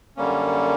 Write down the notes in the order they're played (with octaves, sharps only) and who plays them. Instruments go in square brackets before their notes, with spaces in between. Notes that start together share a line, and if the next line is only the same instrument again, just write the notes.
[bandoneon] F#2 D3 G3 A#3 C#4